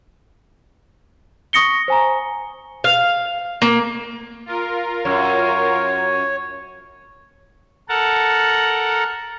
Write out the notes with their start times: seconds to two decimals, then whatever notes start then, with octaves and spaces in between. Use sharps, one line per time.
1.53 C#6 D#6 A#6 C#7 G7
1.88 C5 G#5 A#5
2.84 F5
3.62 A#3
4.46 F4 A#4
5.05 F#2 C#5
7.89 A4 A#4 F#5 A5